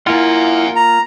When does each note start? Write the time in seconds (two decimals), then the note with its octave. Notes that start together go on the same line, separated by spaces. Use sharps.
0.07 A#3 E4 F4 F#5 G#5
0.76 A#5